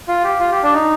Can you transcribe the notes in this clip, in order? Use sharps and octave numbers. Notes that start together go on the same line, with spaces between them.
F4
G4
F4
G4
D4
D#4